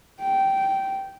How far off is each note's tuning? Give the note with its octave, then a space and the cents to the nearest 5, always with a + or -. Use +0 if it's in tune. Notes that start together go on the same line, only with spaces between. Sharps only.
G5 -15